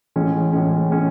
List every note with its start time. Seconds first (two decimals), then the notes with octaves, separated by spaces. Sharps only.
0.16 A2 E3 G#3 C#4
0.52 A2 G#3 C#4
0.90 A2 G#3 C#4